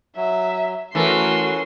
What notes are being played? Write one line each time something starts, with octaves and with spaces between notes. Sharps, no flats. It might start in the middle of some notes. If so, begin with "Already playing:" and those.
F#3 E5
E3 A3 C#4 F#4 A#4 C6